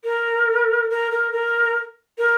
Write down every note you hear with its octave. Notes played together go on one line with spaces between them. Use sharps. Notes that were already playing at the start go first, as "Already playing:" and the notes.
A#4
A#4
A#4
A#4
A#4